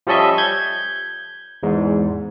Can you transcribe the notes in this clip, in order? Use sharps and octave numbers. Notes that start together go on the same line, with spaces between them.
F3 G3 C#4 A4 D#5 E5
G6 G#6
E2 G#2